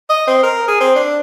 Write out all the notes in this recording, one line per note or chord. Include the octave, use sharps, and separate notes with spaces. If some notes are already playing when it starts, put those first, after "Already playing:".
D#5
C4
A#4
G#4
C4
D4